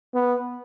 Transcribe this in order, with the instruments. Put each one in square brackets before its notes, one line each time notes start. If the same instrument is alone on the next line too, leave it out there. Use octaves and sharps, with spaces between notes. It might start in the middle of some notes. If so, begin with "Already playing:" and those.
[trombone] B3